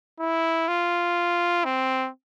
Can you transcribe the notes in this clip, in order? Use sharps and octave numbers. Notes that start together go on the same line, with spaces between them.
E4
F4
C4